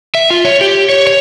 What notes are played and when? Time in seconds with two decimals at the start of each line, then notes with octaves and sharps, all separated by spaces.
0.15 E5
0.31 F4
0.45 C#5
0.61 G4
0.90 C#5
1.07 C#5